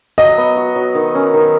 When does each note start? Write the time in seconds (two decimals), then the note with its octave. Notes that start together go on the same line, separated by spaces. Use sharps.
0.18 F#3 D#5
0.38 B3
0.57 F#4
0.76 F#3
0.95 D#3
1.15 C#4
1.34 D#3